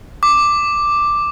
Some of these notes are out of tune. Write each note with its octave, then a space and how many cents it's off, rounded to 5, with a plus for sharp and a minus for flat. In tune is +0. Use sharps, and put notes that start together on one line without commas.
D6 +5